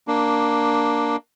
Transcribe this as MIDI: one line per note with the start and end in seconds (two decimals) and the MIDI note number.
0.08 1.16 58
0.08 1.16 62